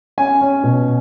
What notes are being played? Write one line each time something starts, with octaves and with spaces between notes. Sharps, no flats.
C#4 G#5
C#4
B2